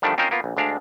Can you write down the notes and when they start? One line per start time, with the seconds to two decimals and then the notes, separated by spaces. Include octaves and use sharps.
0.02 D3 D#3 F3 G3 A3 D4
0.18 C4 C#4 D#4 F4 A#4 C5
0.31 A#3 B3 F4
0.44 A#1
0.57 D2 G#3 D4 F5